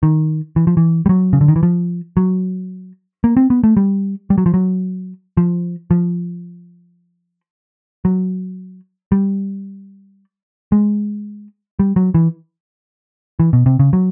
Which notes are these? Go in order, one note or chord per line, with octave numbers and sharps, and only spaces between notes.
D#3
E3
F3
E3
G3
F#3
C#3
D3
D#3
E3
F3
F#3
A#3
C4
B3
A3
G3
G3
F#3
F3
F#3
F3
F3
F#3
G3
G#3
G3
F#3
E3
E3
B2
C3
C#3
F#3